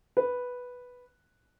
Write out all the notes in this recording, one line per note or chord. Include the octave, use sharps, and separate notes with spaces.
B4